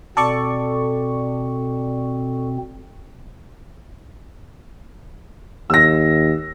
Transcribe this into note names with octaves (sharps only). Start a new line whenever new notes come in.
B2 C4 A4 D5 C#6
D#2 E6 A#6